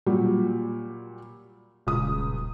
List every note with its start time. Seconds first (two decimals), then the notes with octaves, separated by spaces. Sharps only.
0.07 A#2 F#3 G3
1.87 D#1 C#2 D#6